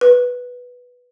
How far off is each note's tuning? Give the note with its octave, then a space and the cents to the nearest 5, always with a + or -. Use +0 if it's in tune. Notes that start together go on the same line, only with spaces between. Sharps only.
B4 -5